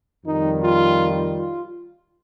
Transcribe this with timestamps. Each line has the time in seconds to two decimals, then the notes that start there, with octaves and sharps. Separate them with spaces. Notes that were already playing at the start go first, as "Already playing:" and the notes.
0.25 F2 D#3 G3 D#4
0.63 F4
1.36 F4